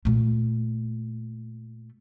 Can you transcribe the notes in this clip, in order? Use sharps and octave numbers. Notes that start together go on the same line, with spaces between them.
A#2 A3